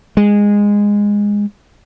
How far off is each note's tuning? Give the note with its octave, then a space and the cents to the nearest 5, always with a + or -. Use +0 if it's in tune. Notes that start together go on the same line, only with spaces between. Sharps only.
G#3 -15